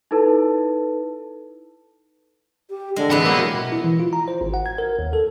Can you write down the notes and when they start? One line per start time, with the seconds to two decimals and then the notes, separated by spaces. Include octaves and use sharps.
0.11 D#4 E4 A4 B4 A5
2.70 G4
2.96 D3 G#3
3.10 C3 E3 G#3 F#5 B5
3.26 F#3 A#3 G4
3.54 B2
3.72 E4
3.84 E3
4.00 F4
4.13 A#5
4.28 C5
4.41 G#1
4.54 F#5
4.66 G#6
4.78 A#4
4.99 D#2
5.13 A4